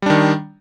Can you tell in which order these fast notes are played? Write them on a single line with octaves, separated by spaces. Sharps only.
G3 D4 D#3